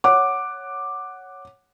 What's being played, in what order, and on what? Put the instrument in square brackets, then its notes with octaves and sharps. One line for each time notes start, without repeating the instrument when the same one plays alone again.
[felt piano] C#5 F#5 D6